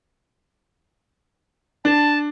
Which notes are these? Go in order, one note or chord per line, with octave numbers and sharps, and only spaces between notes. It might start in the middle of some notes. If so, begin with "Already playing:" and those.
D4 A5